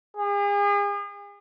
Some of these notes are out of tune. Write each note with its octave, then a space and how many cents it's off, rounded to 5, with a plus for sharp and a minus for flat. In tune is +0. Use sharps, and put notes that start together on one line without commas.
G#4 -40